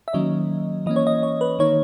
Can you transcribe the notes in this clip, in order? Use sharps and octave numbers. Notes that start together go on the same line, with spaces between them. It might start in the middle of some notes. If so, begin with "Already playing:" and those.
E5
D#3 F#3 A#3 C#4 D#5
E3 A#3 C#4 D#5
C#5
D#5
C#5
B4
D#3 A#3 D#4 C#5